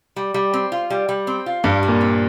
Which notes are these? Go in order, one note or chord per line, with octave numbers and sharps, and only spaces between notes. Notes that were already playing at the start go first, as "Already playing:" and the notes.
G3
G3
C4
F4
G3
G3
C4
F4
G2 G3
G3
A#2
C4